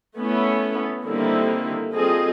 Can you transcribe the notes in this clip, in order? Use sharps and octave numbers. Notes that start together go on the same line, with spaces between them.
A3 B3 C#4 E4
D3 D#3 G3 A#3 C4 E4
G3 C4 F4 G#4 A4 D#5